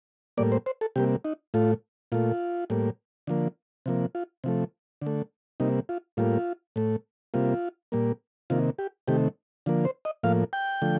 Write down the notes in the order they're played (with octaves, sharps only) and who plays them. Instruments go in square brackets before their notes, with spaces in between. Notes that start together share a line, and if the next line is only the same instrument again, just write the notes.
[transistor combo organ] A2 G3 A#3 D5
C5
C5
A4
C3 G3 A#3 G4
D#4
A2 A3 F4
A#2 A3 F4
A2 G3 A#3
D3 F3 A#3
C3 F3 A#3
F4
C3 F3 A3
D3 A3
C3 G3 A#3 D#4
F4
A2 G3 A#3 F4
A2 A3
C3 G3 A#3 F4
A#2 G3 A#3
C3 D#3 A#3 F4
G4
C3 D#3 A3 G4
D3 F3 A#3
C5
D#5
A2 F3 A#3 F5
G5
D3 F3 A3